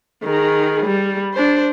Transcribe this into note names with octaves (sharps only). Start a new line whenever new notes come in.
D#3 G#4
G3
D4 C5